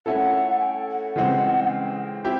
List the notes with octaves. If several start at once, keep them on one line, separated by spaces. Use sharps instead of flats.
A3 C#4 E4 A4 F#5
G#5
G5
F#5
C#3 E3 G#3 C4
G5
C4 E4 G4